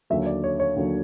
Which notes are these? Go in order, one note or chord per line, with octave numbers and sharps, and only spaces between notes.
D#2 D3 F#3 E5
D5
C#5
C#5
D#2 D3 F#3